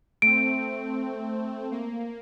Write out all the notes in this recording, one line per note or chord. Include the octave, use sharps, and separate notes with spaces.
A3 C4 D7
A#3